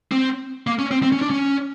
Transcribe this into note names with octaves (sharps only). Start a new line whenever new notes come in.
C4
A#3
C#4
C4
C4
C#4
D4
C#4